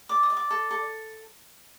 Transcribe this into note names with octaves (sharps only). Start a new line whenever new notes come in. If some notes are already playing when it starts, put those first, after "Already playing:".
D5 D6
D#6
D5
D6
A4
A4